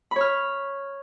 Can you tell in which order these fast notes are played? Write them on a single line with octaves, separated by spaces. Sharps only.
B5 C#5 F6